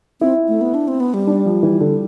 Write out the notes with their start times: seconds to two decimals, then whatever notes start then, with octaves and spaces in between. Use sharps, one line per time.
0.21 C4 E4
0.48 A3
0.61 B3
0.74 D4
0.88 C4
1.00 B3
1.14 G3
1.27 D4
1.46 F3
1.63 E3
1.81 D3